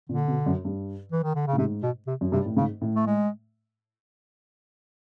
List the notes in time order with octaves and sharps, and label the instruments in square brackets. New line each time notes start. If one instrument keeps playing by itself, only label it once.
[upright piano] A#2 [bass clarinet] D3
[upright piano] B2
F#2
G2
[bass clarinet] E3
D#3
D3
C#3
[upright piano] A2
[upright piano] G#2 [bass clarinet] C3
[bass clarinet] B2
C3
[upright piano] F#2
[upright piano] G2 [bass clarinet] C3
[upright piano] A2
[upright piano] G#2 [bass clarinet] C#3
[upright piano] A2
[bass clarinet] A3
G#3